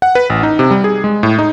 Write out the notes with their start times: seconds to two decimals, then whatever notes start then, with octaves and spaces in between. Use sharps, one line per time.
0.02 F#5
0.15 B4
0.30 A1
0.43 D#4
0.59 C3
0.71 G3
0.84 G#4
1.04 G#3
1.23 A2
1.39 D#4